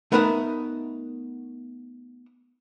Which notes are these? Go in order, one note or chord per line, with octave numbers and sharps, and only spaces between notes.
A3 B3 D#4 A#4 E5 F#5